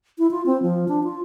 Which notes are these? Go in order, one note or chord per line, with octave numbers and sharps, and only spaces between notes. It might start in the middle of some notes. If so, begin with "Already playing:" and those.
E4
F4
C4
F3
D4
F4